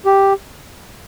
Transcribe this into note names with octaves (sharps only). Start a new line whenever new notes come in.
G4